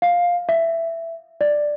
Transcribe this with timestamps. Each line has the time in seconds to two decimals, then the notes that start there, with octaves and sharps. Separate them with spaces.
0.02 F5
0.49 E5
1.41 D5